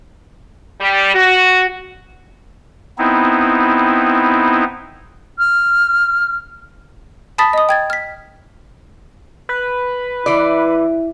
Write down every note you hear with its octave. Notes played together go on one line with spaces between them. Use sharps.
G3
F#4
B3 C4 D#4 E4
F6
A5 B5 D#6 A6 B6
D#5 D#6
G5 G#6 A6
F6 B6
B4
E3 E4 D5